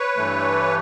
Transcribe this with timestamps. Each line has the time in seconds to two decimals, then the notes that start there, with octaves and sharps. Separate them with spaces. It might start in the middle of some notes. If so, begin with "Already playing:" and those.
Already playing: B4 C#5
0.17 G2 E3 A3